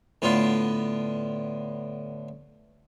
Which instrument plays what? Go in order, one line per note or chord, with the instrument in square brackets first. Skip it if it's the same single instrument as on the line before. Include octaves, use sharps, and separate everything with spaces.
[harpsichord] A2 D3 B3 F4